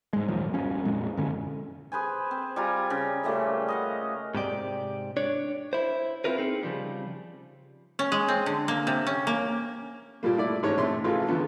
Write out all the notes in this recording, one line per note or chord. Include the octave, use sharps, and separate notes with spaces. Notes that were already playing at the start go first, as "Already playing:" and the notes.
G#2 G#3
D#2 A#2 F3 F#3
F#1 G2 F3 C#4
F2 A#2 G#3
F#2 D3 C#4
G#4 B4 C5 G#5
C4
G3 F4 G#5 A#5
C#3
A#2 C#3 G3 A3
D#5 F5 F#5
G#2 C3 G4 D5
D4 C#5 D5
E4 C5
C4 D4 E4 F4 A#4 B4
C4 D#4 G#4
C#3 F3 G3
C#4
G#3
C4
D3
A#3
C3
C#4
A#3
A#2 F3 G3 A#3
A3 E4 D5
A1 G#2 C#5
A#1 C3 A3 A4 C6
A1 E3 F4 G#4 A4
E2 D3 F3 B3